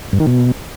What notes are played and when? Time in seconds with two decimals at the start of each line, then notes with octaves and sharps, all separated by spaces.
0.13 G2
0.20 D#3
0.27 B2